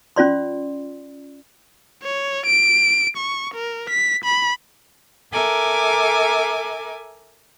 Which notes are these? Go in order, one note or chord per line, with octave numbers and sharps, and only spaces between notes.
C#4 F4 D5 C6
C#5
D7
C#6
A#4
B6
B5
A4 A#4 E5 G#5 D6